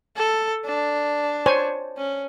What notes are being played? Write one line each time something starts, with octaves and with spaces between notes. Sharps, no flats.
A4
D4
C5 C#5 G#5
C#4